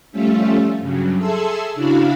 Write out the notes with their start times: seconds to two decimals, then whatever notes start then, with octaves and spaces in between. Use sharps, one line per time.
0.12 F3 G3 A3 C#4 F4 E5
0.79 G2 C#3 F#3
1.18 G#4 A4 E5 A5 C6 E6
1.74 C#3 D4 E4 F#4 F5 B5